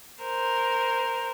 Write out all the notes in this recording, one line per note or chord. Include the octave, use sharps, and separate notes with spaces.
A#4 C5